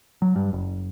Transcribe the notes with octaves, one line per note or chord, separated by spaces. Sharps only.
F#3
G2
F#1